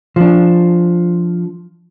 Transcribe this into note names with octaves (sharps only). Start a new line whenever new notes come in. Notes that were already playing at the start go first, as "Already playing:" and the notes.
F3 D4